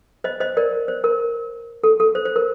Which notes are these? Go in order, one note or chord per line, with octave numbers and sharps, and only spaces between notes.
C5 D#5
C5 D#5
A#4 D5
C5
A#4
A4
A4
C5
C5
A#4